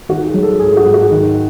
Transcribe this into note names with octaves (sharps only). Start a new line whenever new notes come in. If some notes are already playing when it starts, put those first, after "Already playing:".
D#3 F#4
G#4
F#3
A4
G#2 G#4
F#4
G#2
F#4
D#3